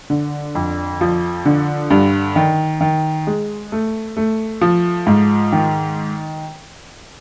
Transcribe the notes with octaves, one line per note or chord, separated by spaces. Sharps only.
D3
F2
F3
D3
G2
D#3
D#3
G#3
A3
A3
F3
G#2
D#3